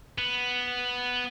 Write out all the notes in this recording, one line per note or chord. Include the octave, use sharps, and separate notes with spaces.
B3